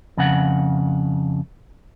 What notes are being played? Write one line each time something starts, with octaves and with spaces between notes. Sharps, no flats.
F2 C#3 F#5